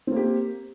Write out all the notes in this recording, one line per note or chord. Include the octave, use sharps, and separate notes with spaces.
A#3 C4 G4